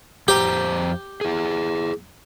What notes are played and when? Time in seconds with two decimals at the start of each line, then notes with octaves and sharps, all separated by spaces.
0.28 F2 G4 C5 A#5
1.21 E4 G#4